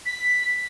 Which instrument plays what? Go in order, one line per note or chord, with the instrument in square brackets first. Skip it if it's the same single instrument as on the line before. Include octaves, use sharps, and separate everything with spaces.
[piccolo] B6